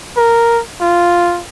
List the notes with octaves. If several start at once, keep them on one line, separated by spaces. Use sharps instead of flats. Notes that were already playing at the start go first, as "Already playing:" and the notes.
A#4
F4